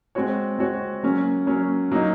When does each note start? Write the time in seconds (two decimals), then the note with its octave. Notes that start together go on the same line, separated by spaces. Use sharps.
0.15 G#3 C4 F#4 C#5
0.59 G#3 C4 F#4 C#5
1.03 F#3 A#3 C#4
1.47 F#3 A#3 C#4
1.91 F#3 A#3 D#4